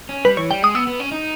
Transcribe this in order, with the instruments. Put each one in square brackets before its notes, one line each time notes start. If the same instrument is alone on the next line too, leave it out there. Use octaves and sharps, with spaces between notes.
[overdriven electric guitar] C#4
[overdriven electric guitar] G3 [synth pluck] B4
[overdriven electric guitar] E3 [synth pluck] C#5
[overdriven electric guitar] G3 [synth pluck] G5
[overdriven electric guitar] G#3 [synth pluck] D#6
[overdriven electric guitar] B3 [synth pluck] E6
[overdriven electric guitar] B3
C#4
D#4